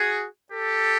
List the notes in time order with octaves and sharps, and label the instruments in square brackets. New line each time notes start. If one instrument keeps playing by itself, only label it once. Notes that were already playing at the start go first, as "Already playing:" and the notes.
Already playing: [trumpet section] F#4 G#4
G4 A4